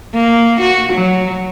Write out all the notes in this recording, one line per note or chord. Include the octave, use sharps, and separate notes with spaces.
A#3
F#4
F#3